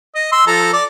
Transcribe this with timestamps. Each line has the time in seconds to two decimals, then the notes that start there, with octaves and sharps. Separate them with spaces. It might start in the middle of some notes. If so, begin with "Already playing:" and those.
0.15 D#5
0.32 C6 E6
0.47 F3 A4 A#5
0.73 D5